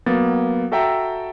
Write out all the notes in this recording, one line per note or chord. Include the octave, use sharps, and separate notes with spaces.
F#3 A#3 B3 A6
F#4 A4 E5 G5 A5 A#5